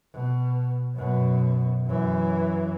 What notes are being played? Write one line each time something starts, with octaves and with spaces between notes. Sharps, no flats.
B2
F#2 B2
F#2 E3